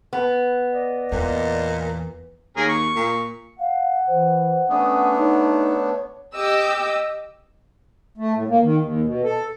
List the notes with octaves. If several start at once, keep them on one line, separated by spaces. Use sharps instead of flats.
B3
D5 D#5
E2 A#2
D#2 C#4 G#4 A#4
C#6
A#2
F5 F#5
E3 C5
A3 B3 C#4 D4 D#6
D#4 C#5
G4 D#5 D6 E6
A3
A2
A#3
D#3
D#2
B2
A4